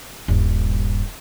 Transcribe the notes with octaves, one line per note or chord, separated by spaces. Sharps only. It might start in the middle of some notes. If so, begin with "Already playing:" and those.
D#1 G2